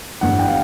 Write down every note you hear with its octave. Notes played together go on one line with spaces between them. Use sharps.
G1 G2 E3 F#5
G5
F5